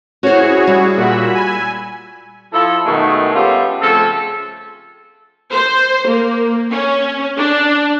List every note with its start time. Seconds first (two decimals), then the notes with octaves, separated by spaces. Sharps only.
0.23 C#4 E4 F#4 G#4 C5 C#5
0.67 G3
0.97 A#2 F#4 B5 E6
1.35 G#5
2.53 F3 E4 F4 A4
2.86 F#2 B2 D#3 G#3 A3
3.35 G3 B3 C#4 F4 G4 A4
3.82 C#3 F3 A3 C4 A4
5.53 C5
6.08 A#3
6.71 C#4
7.38 D4